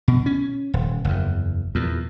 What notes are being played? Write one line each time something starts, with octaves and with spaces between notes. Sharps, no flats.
B2
C#4
D#1
F#1 E2
E2 A#2